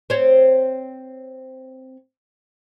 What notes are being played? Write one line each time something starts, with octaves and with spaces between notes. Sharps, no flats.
C4 C#5